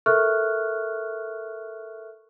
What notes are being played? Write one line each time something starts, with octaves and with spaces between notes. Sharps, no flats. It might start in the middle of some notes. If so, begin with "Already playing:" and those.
A4 A#4 E5 C#6 F6 F#6